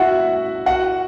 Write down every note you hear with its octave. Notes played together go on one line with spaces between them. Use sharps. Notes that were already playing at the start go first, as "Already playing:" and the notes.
Already playing: E4 F#4 E5 F#5
F#4 F#5